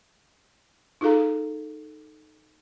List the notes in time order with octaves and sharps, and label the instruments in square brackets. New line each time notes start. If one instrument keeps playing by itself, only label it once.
[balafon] D#4 F4 G#4 A4 F5 A#5